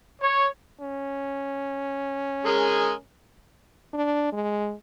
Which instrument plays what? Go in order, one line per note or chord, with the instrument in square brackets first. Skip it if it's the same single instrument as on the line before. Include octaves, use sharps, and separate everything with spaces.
[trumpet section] C#5
[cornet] C#4
[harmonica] G#3 G#4 A#4
[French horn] D4
G#3